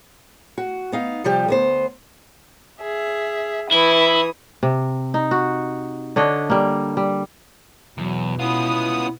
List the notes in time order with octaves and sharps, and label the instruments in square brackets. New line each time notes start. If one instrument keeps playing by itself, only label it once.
[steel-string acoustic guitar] F#4
B3 D#4 F5
C3 F3 G3 G4
D2 B3 C5
[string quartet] G#4 E5
[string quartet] E3 B5 D#6 [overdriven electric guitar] E4
[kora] C3
D#4
F#4
D3 D4 C#5 D#5
G3 A#3
G3
[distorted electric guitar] E2 [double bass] B2 [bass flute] F#3
[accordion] B3 D#6 [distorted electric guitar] C#4 F4 [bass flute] E4